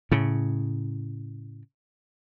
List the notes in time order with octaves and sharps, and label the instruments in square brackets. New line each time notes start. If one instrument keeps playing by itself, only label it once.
[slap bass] A2 C#3